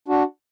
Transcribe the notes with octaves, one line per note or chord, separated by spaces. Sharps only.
D4 F#4